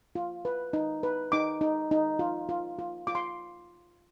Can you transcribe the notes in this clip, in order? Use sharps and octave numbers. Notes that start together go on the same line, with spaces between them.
F4
B4
D#4
B4
D#4 D6
D#4
D#4
F4
F4
F4
F4 D6
C6